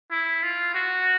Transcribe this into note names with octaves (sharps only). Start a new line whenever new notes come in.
E4
F4
F#4